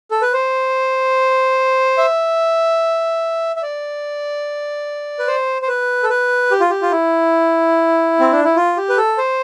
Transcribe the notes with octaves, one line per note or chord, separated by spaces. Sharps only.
A4
B4
C5
E5
E5
D5
B4
C5
C5
B4
A4
B4
G4
F4
G4
F4
E4
C4
D4
E4
F4
G4
B4
A4
C5